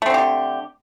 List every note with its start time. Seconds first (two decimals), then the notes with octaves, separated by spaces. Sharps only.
0.02 A3
0.06 C4
0.10 D3
0.14 G4